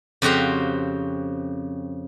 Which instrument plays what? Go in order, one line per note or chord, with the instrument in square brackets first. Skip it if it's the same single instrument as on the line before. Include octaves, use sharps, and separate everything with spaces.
[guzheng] F2 C#3 C4 F#4 G4 F5